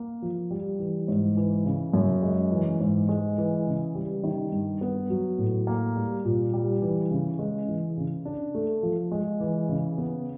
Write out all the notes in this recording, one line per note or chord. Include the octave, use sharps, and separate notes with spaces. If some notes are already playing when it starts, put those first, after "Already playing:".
Already playing: A#3
F3
G3
E3
G#2
E3
C#3
F#2
G#3
E3
G#2
G#3
E3
C#3
G3
D#3
G2
B3
F#3
A2
A#3
G3
A#2
G3
E3
C#3
G#3
E3
C#3
D4
A3
F3
G#3
E3
C#3
B3